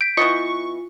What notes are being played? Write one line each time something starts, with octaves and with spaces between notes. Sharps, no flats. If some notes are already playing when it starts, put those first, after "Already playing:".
G6 B6 D7
E3 B3 F4 D#5 C#6 C#7